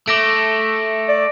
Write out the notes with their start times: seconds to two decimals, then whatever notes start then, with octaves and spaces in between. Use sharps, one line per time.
0.08 A3 D6 A#6 D7
1.09 D5